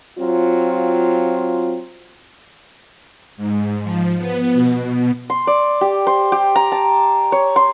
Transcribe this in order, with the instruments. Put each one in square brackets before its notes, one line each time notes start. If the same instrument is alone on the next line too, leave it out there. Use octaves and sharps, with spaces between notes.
[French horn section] F#3 C4 F4
[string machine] G#2
F3
B3
B2
[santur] C6
D5
G4
C5
G4
A#5
A5
C#5
C6